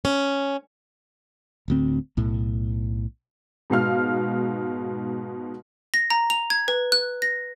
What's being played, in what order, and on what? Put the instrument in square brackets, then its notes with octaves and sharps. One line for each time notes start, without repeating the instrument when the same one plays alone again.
[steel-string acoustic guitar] C#4
[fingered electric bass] D1 D2 C4
B1 A2
[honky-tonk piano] G#2 B2 F5 F6
[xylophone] A#6
A#5
F7
G#6
B4
F#6
A#6